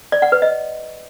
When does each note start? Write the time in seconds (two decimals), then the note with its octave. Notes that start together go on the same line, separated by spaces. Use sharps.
0.12 D5
0.22 F#5
0.32 B4
0.42 D#5